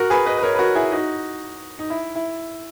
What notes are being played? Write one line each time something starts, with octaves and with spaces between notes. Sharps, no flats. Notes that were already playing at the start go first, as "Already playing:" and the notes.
Already playing: F#4 A#4
G#4 B4
B4 D#5
B4
A#4 C#5
B4
F#4 A#4
E4 G#4
D#4 F#4
D#4
E4
E4